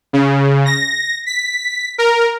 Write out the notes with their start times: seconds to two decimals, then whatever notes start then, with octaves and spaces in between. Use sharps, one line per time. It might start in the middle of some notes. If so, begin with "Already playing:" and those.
0.13 C#3
0.66 A#6
1.26 B6
1.98 A#4